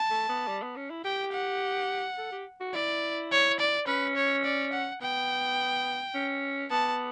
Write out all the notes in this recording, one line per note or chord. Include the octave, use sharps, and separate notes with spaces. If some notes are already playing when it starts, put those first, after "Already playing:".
Already playing: A5
A3
B3
G3
B3
C#4
E4
G4 G5
F#5
A4
G4
F#4
E4 D5
C#5
D5
C#4 B4
C#5
D5
F#5
B3 G5
C#4
B3 A5